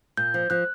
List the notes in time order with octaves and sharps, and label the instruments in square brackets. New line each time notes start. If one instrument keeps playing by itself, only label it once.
[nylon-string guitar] A#2 [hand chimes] G6
[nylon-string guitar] F3
[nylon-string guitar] F3 [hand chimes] F#6